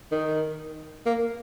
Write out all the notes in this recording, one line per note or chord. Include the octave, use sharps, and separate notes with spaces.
D#3
A#3